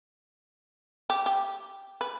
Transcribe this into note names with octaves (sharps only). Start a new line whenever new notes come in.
G4
G4
B4